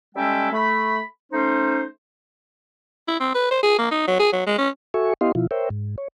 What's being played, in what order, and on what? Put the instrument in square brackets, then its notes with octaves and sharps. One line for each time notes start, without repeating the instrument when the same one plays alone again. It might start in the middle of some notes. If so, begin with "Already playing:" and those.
[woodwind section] G3 G#3 C#4 A4 E5 G5
A3 B5
A3 C#4 D#4 C5
[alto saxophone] E4
C4
B4
C5
G#4
A#3
D#4
F#3
G#4
F#3
G#3
C#4
[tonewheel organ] F#4 A4 E5 G#5 C#6
B3 E4 G4 D#5 F5 C6
B2 F3 E4 F4
A#4 C5 C#5 E5 G5
G#2
C#5